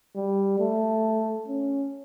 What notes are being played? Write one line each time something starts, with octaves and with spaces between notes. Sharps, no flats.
G3
A3
C#4